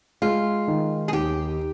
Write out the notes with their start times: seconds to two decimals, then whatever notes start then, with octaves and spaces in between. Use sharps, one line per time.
0.22 G#3 F4
0.68 D#3
1.08 G#4
1.13 D#2 G4